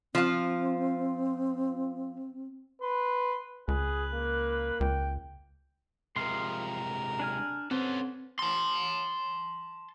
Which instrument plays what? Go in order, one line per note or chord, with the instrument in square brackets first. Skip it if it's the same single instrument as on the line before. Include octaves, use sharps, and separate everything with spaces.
[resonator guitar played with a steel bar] F3 F4 [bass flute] C4
[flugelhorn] B4 [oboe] C6
[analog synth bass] C#2 [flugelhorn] G#4 [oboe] B4
[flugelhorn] A#3
[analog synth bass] C#2 [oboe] G5
[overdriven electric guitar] C3 G#3 [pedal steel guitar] F3 F5 C6 [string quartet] A#4
[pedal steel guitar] D4 G#5 F6
[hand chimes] C4 [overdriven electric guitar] C#4 A4 [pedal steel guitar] B4 C5
[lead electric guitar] A5 C6